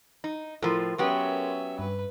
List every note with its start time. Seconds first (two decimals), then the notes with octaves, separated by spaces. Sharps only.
0.24 D#4
0.62 A2 F3 A4 A#4 C6
0.98 F#3 B3 C#4 G4 E5
1.79 G2 B4